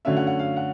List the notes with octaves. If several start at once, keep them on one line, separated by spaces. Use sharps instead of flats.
F#2 D3 F#3 A3 C#4 E5
F#5
F#5
F5
F#5